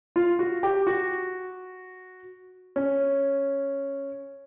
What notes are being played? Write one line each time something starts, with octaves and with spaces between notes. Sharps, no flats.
F4
F#4
G4
F#4
C#4